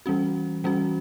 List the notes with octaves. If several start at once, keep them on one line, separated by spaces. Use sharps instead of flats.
E3 G3 C#4 F#4
E3 G3 C#4 F#4